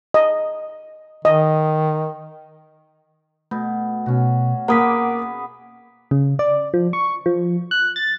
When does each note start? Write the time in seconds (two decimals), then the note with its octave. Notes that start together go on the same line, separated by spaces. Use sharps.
0.14 D#5
1.25 D#3 D#5
3.51 B2 A3
4.06 B2 C#4 F#4
4.68 A#3 B3 G#4 F#5 D6 D#6 B6
6.11 C#3
6.39 D5
6.74 F3
6.93 C#6
7.26 F3
7.71 F#6
7.96 A6